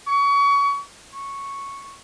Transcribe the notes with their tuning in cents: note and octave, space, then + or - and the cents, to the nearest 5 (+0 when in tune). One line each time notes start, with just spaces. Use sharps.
C#6 +30
C#6 -5